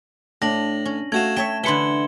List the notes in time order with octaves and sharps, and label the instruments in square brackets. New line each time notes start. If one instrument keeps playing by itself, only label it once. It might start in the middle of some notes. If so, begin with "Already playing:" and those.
[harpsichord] A2 [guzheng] D4 [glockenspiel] A#6 F#7
[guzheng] C#4
[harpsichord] A3 F#4 F5 [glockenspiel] G#6 E7
[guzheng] A3 C#5 E5 [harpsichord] G5
[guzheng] D3 B4 B5 [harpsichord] E3 [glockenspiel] C6 C#7 G7